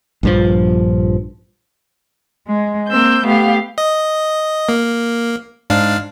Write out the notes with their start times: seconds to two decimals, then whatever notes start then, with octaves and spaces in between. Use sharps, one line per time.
0.23 A#1 G2 F3
2.46 G#3
2.88 A#3 C4 E6 G6
3.25 A3 B3 G4 F5
3.78 D#5
4.69 A#3
5.70 G#2 D4 F5